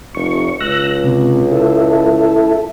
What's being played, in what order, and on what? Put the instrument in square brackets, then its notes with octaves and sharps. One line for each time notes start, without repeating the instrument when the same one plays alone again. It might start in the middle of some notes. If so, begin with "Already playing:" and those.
[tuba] F1 [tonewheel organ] C#6
[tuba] C#2 [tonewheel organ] E6 F#6 A#6
[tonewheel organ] C3
E4 A4